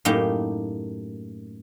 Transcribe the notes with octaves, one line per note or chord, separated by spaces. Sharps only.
F#2 A2 A#3 D#4 G4